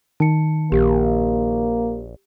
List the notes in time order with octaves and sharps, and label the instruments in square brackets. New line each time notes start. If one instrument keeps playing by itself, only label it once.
[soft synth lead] D#3 [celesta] A5 C#7
[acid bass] A#1 [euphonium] A#3 [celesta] G4